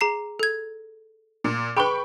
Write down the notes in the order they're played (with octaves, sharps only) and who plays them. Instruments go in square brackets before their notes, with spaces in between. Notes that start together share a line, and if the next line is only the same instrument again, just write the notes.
[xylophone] G#4 A#5 C7
A4 G#6
[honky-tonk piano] A#2
[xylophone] G#4 B4 [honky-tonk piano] G5 B5 C#6